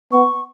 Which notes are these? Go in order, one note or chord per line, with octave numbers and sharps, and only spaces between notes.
B3 C#6